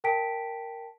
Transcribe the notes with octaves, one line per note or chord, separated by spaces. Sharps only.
A#4 G5 A5 B6 D7